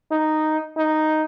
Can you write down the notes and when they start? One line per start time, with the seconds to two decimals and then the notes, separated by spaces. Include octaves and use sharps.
0.11 D#4
0.77 D#4